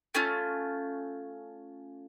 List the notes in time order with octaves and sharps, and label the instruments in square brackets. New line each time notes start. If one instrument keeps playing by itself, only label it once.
[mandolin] A3 C#4 F4